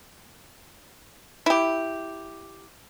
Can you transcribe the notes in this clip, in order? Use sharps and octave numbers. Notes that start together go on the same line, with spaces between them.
E4 G4